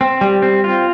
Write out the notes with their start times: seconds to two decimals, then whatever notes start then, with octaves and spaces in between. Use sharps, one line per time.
0.01 C4
0.21 G3
0.42 C4
0.64 F4